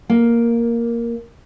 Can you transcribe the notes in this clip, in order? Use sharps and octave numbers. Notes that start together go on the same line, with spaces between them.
A#3